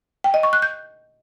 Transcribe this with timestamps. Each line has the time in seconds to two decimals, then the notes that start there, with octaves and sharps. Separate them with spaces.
0.24 G5
0.34 D#5
0.43 C#6
0.53 F#6
0.62 G6